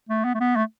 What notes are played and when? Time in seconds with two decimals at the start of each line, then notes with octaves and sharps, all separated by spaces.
0.09 A3
0.25 B3
0.35 A3
0.40 B3
0.56 A3